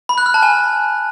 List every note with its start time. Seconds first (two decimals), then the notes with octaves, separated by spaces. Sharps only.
0.09 B5
0.18 F#6
0.26 F6
0.34 A5
0.43 G#5